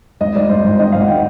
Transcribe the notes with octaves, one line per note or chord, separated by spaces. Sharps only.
G#1 D#5
G#1 D5
G2 C5
G#1 C5
D#3 D#5
G#1 F5
F#5
D#3 G5